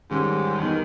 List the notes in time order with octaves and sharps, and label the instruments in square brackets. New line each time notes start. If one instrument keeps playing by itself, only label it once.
[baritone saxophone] G#2 [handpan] D#3 G3 C#4 G4
[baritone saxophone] D#3 [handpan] E3 G3 B3 D#4 G4